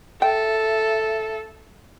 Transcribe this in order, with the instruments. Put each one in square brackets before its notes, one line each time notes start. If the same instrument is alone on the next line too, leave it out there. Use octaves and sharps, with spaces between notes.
[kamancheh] A4 [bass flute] E5 [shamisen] G5